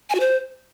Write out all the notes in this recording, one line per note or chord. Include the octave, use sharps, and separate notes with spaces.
G#5
F#4
C5